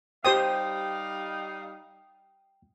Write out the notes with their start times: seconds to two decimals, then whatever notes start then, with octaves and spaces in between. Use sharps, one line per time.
0.25 G3 D#4 G4 C5 F5 G5 D#6